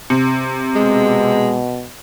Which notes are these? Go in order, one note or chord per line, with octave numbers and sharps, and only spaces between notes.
C3
B2 G#3